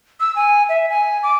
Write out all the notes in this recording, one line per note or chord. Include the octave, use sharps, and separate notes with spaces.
E6
G#5
E5
G#5
D6